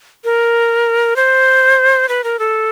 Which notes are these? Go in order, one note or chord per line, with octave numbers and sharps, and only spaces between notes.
A#4
C5
B4
A#4
A4